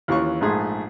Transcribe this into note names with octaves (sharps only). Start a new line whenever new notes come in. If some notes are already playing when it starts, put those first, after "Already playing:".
D#2 E3 C#4 F4 C#6
A#1 G#2 A3 G#4 C6